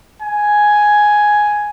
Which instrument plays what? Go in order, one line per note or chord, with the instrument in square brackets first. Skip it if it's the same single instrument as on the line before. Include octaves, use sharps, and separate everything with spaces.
[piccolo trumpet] G#5